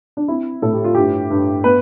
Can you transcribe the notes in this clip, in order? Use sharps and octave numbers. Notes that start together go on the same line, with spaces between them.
D4
C4 E4
A2 A4
G4
F4
G2 G4
G2
B3 B4